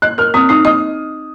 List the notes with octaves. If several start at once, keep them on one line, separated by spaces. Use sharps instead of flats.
D#5 F#6
A#4 F6
C4 D#6
D#4 D#6
D#5 D#6